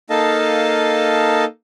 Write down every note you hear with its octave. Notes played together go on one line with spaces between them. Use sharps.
A#3 D#4 A4 D#5 F5 A5